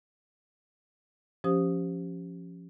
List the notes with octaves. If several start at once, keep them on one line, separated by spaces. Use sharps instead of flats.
F3 C#4 G4 C5 D#6